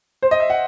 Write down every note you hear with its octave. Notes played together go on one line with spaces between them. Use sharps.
C5
D#5
E5
F#5